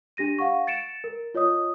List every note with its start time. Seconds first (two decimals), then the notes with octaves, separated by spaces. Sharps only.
0.17 D4 G4 A#6 D#7
0.39 F5 F#5 C#6
0.67 A6 C#7 D7 E7
1.04 A#4
1.34 F4 C#5 D#5 D#6